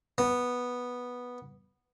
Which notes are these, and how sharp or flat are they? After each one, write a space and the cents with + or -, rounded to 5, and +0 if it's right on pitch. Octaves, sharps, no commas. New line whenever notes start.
B3 -5